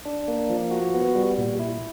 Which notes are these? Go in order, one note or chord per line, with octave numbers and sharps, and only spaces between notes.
D4
A#3
F3
F#4
B3
G3
A#2
E4